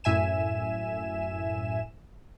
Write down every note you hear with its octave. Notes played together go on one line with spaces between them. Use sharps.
F#2 A2 E5 G#5 E7